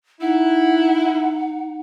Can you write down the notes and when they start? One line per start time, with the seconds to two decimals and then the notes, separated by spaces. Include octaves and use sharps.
0.21 D#4 E4 F#5